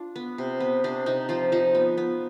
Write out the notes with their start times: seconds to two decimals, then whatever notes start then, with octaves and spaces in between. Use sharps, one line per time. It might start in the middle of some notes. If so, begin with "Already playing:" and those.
Already playing: D4 F4
0.16 B3
0.38 C3
0.60 B3
0.84 C3 D4
1.06 C3 D#4
1.29 F3 F4
1.52 F3 D#4
1.75 B3
1.98 B3